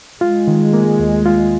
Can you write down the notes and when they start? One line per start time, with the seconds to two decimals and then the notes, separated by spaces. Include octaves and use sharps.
0.20 G#3 F4
0.47 D#3
0.73 A#3
1.00 D#2
1.26 F4